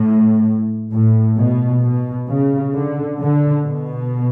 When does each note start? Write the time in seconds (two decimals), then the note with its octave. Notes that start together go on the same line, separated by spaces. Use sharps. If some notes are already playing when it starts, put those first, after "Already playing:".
Already playing: A2
0.92 A2
1.37 B2
1.82 B2
2.28 C#3
2.73 D3
3.19 D3
3.65 B2